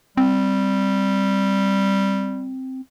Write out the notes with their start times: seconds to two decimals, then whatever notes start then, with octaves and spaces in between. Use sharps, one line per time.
0.17 G3 C4